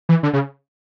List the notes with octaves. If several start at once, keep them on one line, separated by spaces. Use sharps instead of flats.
E3
D3
C#3